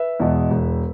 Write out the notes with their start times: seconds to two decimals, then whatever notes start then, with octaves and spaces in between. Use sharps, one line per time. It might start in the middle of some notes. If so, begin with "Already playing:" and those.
Already playing: B4 E5
0.19 E2 B2 G#3
0.50 E1